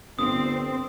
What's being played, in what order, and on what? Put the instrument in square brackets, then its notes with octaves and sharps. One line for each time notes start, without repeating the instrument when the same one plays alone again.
[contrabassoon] G1 [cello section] C4 [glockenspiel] D#6